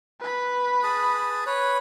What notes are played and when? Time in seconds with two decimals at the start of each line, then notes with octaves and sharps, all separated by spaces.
0.21 B4 B5
0.83 G#4 A5 D#6
1.46 B4 C#5